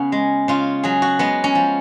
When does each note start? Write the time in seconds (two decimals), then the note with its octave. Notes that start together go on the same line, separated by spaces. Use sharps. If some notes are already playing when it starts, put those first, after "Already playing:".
Already playing: C#3 B3 C#4
0.12 G#3
0.48 C#3 F4
0.83 F#3 G#4
1.02 F#4
1.19 G#3 B3
1.44 C#4
1.55 F3